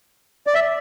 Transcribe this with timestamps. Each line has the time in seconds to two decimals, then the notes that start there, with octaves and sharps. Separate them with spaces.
0.47 D5
0.54 E5